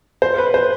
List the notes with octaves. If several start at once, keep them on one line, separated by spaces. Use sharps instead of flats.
C5
B4
C5